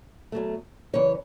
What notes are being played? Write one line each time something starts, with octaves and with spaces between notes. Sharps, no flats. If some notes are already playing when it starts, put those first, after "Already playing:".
B2 F#3 A3
F#2 C#3 E3 C#5